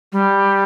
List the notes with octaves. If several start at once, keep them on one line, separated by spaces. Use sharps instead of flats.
G3